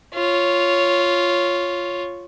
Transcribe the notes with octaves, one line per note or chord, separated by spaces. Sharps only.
F4 C#5